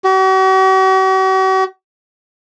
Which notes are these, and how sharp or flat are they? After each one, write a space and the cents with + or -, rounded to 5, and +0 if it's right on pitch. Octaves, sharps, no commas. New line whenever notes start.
F#4 +45